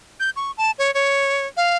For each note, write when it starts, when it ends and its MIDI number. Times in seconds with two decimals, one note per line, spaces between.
0.20 0.30 91
0.36 0.51 85
0.57 0.71 81
0.78 0.93 73
0.94 1.46 73
1.57 1.77 77